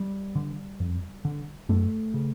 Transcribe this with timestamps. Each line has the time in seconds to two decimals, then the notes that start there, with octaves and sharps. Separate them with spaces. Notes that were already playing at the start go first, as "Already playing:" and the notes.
Already playing: G3
0.35 D3
0.80 F2
1.25 D3
1.69 F#2 A3
2.14 C#3